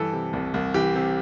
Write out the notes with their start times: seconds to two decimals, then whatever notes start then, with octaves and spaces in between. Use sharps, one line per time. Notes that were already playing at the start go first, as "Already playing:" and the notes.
Already playing: G2 E3 A4
0.13 C3
0.33 C2
0.54 C2
0.74 E3 G4
0.95 C3